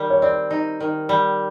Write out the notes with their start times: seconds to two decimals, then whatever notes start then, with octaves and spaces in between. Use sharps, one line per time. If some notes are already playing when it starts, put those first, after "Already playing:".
Already playing: D#3 G3
0.10 C#5
0.22 C4 D5
0.51 D#4
0.80 D#3
1.09 G3